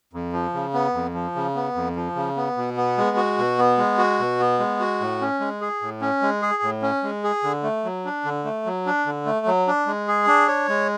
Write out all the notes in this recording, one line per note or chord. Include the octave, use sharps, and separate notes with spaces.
F2
F3
C#3
B3
F2
F3
C#3
B3
F2
F3
C#3
B3
B2
B3
G#3
F#4
B2
B3
G#3
F#4
B2
B3
G#3
F#4
A2
C#4
G#3
G#4
A2
C#4
G#3
G#4
A2
C#4
G#3
G#4
D3
A3
F#3
D4
D3
A3
F#3
D4
D3
A3
F#3
D4
G#3
G#4
D4
C#5
G#3